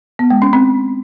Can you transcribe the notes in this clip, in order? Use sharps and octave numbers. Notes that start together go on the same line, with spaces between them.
B3
G#3
C#4
C4